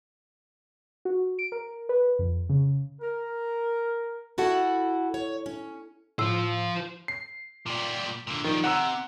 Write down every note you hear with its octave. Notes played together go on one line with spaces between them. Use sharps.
F#4
D7
A#4
B4
F2
C#3
A#4
E4 F#4 A4 F#5
C#5
C#4
A2 F4 C5 E6
C7
A#2 G3
A#2 D3
D#3 F3 G3
C3 F#5 A#5 E6